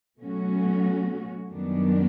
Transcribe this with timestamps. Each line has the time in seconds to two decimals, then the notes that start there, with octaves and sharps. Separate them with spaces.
0.19 B2 F#3 A3 C#4 F#4
1.49 F#2 D#3 G3 B3 D4